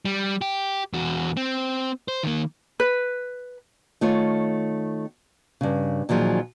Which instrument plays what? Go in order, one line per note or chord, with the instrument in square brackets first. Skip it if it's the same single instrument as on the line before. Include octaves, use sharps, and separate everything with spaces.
[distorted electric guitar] G3
G4
E2 F#4
C4
C5
D#3 A#3
[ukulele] B4
[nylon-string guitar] D#3 A3 F4 C#5
G2 C#3
A#2 D#3 F3 F#3 G#4